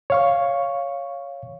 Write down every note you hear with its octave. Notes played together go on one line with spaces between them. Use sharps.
C#5 F5 C#6